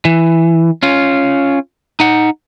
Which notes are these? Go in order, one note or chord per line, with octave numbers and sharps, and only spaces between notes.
E3
C#4 F4
D#4 F#5